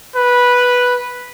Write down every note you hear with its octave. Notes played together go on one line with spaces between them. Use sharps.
B4